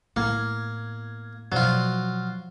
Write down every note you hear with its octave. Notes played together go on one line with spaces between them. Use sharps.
A2 A#3 B3 G#6
B2 F3 F#3 F4 C5 D5